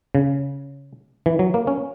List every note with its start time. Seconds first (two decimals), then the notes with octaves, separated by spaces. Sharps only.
0.15 C#3
1.26 E3
1.39 F#3
1.54 A#3
1.67 C#4